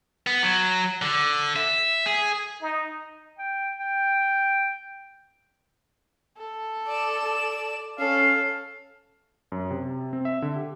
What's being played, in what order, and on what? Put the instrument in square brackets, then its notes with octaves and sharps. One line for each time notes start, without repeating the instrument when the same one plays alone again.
[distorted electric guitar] B3
F#3
D3
E5
G#4
[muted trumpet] D#4
[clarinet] G5
G5
[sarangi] A4
[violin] D5 E7
[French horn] C#4 [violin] A4 [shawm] F5
[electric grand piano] F#2
C3
C4
E5
D3
G4